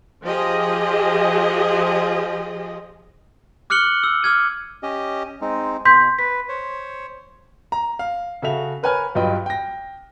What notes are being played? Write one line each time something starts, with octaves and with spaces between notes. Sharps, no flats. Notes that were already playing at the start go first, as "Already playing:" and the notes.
F3 G4 G#4 D#5
D6 F6 F#6 C#7 F#7 G7
E6
D6 F6 G#6 D#7
C#4 G4 D#5
G#3 C4 D#4
B2 C6 G6 B6
B4 B6
C5 C#5
A#5
F5
C#3 F#4 A4 E5 F7
A#4 B4 C#5 G#5 F6
G2 F#3 F4 B4 D#5 G5
G5 A#6